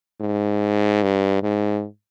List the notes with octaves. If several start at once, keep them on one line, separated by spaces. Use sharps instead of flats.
G#2
G2
G#2